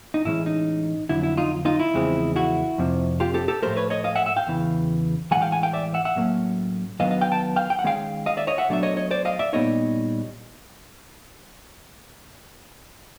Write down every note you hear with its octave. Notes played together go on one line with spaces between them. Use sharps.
D#4
A2 E3 G#3 C#4 E4
D#4
F2 D3 F#3 E4
E4
D#4 F4
D#4 F4
E4
E2 C#3 F3 G#3 C4
E4 F#4
F2 C3 F3
F4 G4
G4 A4
G4 A4
A2 F3 A3 A#4 C5
B4 C#5
C#5 D#5
D#5 F5
E5 F#5
E5 F#5
F5 G5
E2 C#3 E3
A2 E3 G#3 F#5 G#5
F5 G5
F#5 G#5
F5 G5
D5 E5
E5 F#5
E5 F#5
A2 F#3 A#3 C#4
D#3 F#3 B3 D4 D#5 F5
D#5 F5
F5 G5
G5 A5
F5 G5
G5
F#5
D#3 G#3 C#4 F5 G5
D#5 F5
D5 E5
C#5 D#5
E5 F#5
B2 F#3 A3 D4 E5
C#5 D#5
C#5 D#5
C5 D5
D#5 F5
D5 E5
A#2 G3 B3 D#4 C#5 D#5